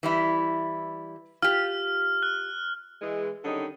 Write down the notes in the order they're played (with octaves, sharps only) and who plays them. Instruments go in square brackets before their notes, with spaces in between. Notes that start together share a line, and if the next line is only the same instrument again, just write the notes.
[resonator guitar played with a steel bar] E3 G3 E4
[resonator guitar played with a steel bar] F4 G4 [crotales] F6
[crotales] F#6
[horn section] E3 G#3
D3 D#3 G3 C#4 D#4